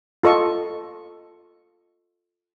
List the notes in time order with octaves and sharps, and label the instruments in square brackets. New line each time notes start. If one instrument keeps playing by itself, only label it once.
[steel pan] F4 A4 D#5 C#6